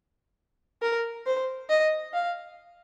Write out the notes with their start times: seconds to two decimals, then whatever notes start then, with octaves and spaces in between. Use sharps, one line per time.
0.82 A#4
1.26 C5
1.70 D#5
2.13 F5